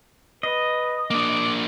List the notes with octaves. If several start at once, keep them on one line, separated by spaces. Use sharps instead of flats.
B4 D#5
A#3 D4 D6